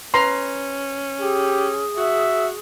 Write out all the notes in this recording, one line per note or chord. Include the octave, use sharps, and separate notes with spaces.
C#4 B4 A#5 C6
G4 G#4
F#4 E5